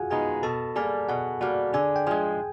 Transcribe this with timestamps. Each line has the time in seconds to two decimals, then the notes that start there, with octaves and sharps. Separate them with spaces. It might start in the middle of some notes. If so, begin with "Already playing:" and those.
Already playing: F4 F#4 G#4 F5 F#5 G#5
0.11 D#3 G#3 B3 D#4 G#4 G#5
0.43 B2 A4 A5
0.76 G3 A#3 G#4 G#5
1.08 B2 F#4 F#5
1.41 G3 A#3 F#4 F#5
1.73 D3 G#4 G#5
1.96 G5
2.07 F3 G#3 G#4 G#5